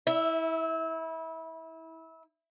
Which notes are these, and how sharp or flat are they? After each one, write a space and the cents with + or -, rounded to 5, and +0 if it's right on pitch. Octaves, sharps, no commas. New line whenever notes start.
E4 -25 E5 +0